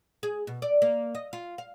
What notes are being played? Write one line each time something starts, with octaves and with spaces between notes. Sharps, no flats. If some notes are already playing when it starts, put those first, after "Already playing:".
G#4
B2
D5
A#3
D#5
F4
F5